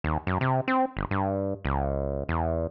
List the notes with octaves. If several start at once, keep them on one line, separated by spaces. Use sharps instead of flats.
D#2
F#2
C3
C4
G1
G2
C#2
E2